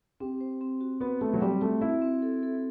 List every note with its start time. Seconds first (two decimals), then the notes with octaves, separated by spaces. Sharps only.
0.20 C4 G4
0.41 C5
0.61 C4
0.81 F#4
1.00 B3 F#4
1.21 A3 F#4
1.33 F#3
1.41 G3 C4
1.61 A3 F#4
1.81 C4 E4
2.02 C4
2.22 A4
2.43 A4